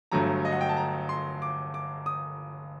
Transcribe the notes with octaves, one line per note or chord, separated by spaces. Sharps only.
G1 G2 F#3 A3 A#5
D#5
F#5
G5
A5
A#5
C6
D6
D6
D#6